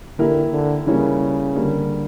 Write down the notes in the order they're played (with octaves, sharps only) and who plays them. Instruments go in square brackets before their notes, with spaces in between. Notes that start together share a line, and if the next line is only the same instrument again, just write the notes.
[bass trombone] D3 [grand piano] E3 A#3 E4 G4 A#4
[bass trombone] D3
[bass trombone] C#3 [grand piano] E3 G3 A#3 C#4
[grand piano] D3 G3 A#3